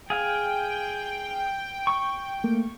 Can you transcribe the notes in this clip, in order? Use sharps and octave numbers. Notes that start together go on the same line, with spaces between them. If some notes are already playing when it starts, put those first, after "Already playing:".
G#4 F5 G5
C#6
A3 A#3